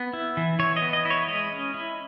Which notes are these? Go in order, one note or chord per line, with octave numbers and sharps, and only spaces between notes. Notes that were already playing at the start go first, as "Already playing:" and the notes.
Already playing: B3
E4
E3
E3 C#5
D#5
B3
D#5
E4
C#5
G#3 D#5
C#4
E4